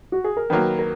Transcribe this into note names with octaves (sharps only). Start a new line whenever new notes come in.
F#4
G#4
A#4
D#3 F#3 A#3 B4
A#4